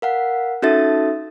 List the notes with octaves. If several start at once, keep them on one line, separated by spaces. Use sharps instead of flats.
A#4 F5 F#5
C#4 D#4 F#4 A4 E5 A6